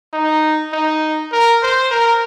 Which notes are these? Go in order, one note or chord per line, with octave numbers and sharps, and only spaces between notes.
D#4
D#4
A#4
C5
A#4